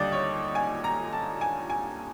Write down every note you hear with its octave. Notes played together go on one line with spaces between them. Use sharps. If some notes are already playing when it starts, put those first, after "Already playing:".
Already playing: D#2 D3 G3 D5 D#5
C#5
G#5
A#5
A5
G#5
G#5